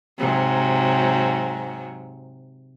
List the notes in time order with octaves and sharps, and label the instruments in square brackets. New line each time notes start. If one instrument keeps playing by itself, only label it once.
[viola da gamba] G#2 C3 F#3